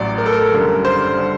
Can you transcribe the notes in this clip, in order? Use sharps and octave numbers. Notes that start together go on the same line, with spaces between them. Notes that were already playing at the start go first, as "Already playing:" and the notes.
Already playing: A1 A2 F#3 D5
A#4
A4
A#4
F#1 F#2 D3 G3
C5
D3 G3